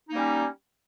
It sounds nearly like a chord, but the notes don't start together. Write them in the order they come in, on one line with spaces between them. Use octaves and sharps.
D#4 A#3 G3 C#4